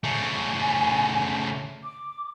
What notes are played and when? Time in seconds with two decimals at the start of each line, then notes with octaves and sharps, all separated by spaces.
0.04 C#3 A3 G#5
1.83 D6